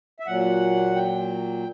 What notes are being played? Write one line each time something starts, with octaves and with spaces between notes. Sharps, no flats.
E5
A#2 F#3 F#5
G5